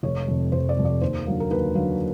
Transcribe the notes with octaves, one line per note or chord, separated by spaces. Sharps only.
F1 C#5
F2 C3
F1 C5
D5
F2 C3
D5
D#2 C5
D3 F#3 A#3
A#4
D#2 B4
D3 F#3 A#3